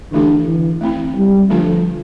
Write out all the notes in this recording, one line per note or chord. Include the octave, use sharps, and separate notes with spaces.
D3 E3 A3 E4 G4
E3
A3 C4 E4
G3
D3 F3 A3 D4 F4 A4